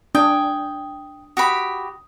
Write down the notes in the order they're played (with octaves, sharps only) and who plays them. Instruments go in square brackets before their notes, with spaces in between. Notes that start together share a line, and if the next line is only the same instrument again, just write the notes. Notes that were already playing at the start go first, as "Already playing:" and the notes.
[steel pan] D4 [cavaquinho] G5 G#5 [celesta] D#6
[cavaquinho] F#4 G4 B5 [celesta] D#6